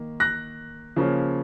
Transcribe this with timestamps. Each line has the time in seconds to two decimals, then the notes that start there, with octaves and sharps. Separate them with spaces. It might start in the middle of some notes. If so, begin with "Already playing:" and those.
Already playing: D#3 A#3
0.20 F#6 A#6
0.96 C#3 F3 A#3 C#4